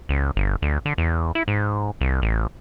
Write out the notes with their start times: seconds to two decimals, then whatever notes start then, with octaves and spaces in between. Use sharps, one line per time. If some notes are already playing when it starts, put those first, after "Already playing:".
0.09 C#2
0.36 G1
0.62 D2
0.86 D3
0.98 E2
1.35 E4
1.48 G#2
2.01 C2
2.22 A1